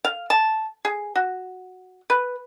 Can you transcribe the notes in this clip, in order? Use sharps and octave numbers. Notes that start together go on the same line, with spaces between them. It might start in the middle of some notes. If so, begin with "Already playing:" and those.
F5
A5
G#4
F#4
B4